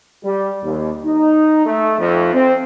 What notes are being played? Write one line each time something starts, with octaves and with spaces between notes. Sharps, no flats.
G3
D#2
D#4
A3
F2
C4